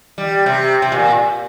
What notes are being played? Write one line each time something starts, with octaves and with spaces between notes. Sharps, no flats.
G3
C3
C3
A#2